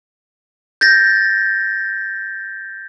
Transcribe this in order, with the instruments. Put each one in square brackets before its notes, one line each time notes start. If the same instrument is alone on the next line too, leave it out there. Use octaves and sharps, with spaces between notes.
[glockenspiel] G6 A6 A#6